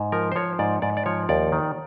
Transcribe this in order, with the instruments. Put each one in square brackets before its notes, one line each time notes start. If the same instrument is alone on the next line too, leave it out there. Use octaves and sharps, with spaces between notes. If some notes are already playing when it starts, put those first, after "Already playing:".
Already playing: [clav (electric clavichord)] G#2
F3 A#4
C5
F3 C#5
G#2 D5
G#2 D5
D5
F3 C#5
D#2 D5
D#3